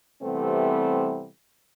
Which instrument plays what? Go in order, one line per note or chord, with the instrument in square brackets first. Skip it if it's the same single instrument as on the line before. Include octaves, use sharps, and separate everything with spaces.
[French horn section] C3 E3 G3 A3 B3 C4